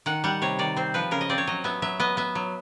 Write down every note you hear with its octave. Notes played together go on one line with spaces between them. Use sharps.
D#3 F#5
G3 F#5
C3 C#5
D#3 D5
C4 C5
F3 B4
C#3 A#4
D#5
C4 D5
C#5
F#3 D#5
B3 E5
F#3 E5
B3 D#5
B3 E5
F#3